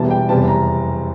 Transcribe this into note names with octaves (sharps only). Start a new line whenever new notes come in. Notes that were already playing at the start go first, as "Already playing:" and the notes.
Already playing: E1 E2 E3 G3 A5
G5
F1 E2 E3 G3 A5
A#5